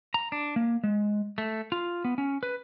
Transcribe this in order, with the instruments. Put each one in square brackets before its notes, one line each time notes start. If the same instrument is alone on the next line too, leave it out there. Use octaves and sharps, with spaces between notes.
[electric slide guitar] A#5
D4
A#3
G#3
A3
F4
B3
C#4
B4